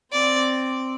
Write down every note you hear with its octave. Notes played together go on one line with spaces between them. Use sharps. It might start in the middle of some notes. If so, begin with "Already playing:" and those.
C4 D5